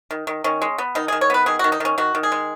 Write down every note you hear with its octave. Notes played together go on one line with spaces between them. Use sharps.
D#3
D#3
D#3 C#4
G#3
B3
D#3 D#4
G#4
D#3
C#5
B3 B4
D#3 G#4
F#4
D#3
D#4
D#3 C#4
D#3 F#4
D#3
G#4
G#3